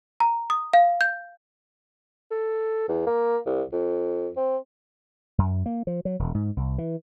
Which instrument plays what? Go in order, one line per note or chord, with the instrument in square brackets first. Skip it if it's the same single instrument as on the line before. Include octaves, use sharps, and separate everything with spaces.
[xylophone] A#5
D#6
F5
G6
[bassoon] A4
E2
A#3
C2
F2
C4
[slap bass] F#2
A#3
F3
F#3
E1
G#2
C2
E3